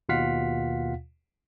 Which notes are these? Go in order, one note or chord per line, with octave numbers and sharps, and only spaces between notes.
D#2 B2 F4 F5 F#5 B6